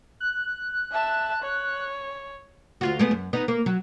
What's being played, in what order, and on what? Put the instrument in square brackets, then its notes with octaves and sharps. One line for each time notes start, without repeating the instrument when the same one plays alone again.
[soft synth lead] F#6
[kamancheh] E5 A5
C#5
[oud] D2 F4 F#4
G#3 A3 B3
F#2
B3 D#4
A#3
F#3